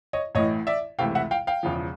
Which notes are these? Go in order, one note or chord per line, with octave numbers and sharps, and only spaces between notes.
C#5 D#5
A1 A2 E3 C#5 D#5
D5 E5
C#2 C3 E3 A3 F5 G5
E5 F#5
F5 G5
F5 G5
E1 E2 C#3 F3